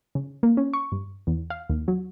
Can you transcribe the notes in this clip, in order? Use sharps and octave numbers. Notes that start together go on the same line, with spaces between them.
C#3
A#3
C#4
C#6
G2
E2
F5
D#2
F#3